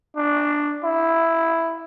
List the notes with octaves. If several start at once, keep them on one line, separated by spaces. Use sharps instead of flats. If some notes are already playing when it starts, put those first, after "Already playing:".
D4
E4